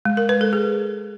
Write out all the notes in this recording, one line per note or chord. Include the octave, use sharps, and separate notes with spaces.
G#3
A#4
B4
A4
G#4